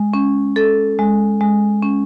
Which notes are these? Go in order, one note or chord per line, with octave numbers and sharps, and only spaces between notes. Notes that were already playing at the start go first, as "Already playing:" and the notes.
Already playing: G#3
C#4
A4
G#3
G#3
C#4